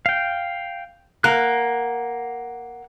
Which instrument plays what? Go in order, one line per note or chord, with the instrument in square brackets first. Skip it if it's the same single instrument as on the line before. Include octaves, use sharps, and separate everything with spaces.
[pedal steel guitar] F5 G5
[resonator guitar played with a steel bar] A#3 [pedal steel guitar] F#5 F#6